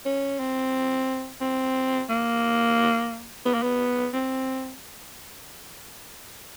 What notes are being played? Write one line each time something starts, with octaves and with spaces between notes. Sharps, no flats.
C#4
C4
C4
A#3
B3
A#3
B3
C4